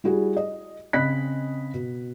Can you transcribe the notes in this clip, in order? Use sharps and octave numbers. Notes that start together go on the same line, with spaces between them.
G3 E4 F#4 G#4
D#5
C#3 C4 D#5 B5 F#6 B6
B2